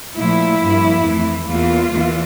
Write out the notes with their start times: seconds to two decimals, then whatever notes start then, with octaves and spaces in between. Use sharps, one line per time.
0.19 A#2 F3 A3 E4
0.62 G2 F3 A#3
1.05 F2 E3 A3
1.49 E2 E3 A#3 F4
1.92 E2 E3 A#3